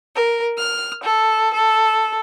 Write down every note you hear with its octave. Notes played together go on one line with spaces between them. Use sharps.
A#4
F6
A4
A4